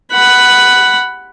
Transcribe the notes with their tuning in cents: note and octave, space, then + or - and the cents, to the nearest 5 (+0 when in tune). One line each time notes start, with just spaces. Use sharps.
F#5 +10 B5 +0